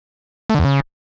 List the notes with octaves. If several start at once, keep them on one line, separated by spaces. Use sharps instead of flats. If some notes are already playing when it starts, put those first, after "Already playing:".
A3
D3
E2
C#3